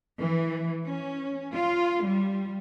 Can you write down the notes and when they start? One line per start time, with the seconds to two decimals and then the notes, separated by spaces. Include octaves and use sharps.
0.20 E3
0.83 C#4
1.54 F4
2.08 G3